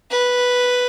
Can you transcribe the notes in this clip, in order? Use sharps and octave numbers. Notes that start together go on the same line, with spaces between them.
B4